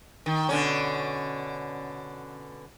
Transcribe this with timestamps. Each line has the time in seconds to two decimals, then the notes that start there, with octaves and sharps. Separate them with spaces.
0.26 D#3
0.49 B2 D3 C#4